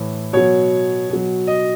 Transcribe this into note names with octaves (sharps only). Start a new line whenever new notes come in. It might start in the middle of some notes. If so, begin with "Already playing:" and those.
Already playing: A2 E3
B2 F#3 C#5
B2 F#3
D#5